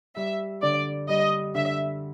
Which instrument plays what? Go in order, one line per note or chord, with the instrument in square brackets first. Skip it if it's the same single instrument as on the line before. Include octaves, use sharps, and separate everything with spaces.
[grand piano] G3 [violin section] E5
[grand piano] D3 [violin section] D5
[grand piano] G3 [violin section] D#5
[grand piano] D3 [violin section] E5